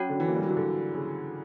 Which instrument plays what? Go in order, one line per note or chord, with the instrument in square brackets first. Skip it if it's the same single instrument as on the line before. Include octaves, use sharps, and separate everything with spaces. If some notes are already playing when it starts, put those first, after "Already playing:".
Already playing: [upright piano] F#3 [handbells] C#4 F#4 C#5 G5
[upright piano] D3
E3
A#3
G3
F#3
E3
D3
C#3